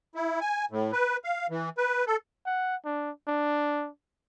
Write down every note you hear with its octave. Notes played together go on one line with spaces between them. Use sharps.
E4
G#5
A2
B4
F5
E3
B4
A4
F#5
D4
D4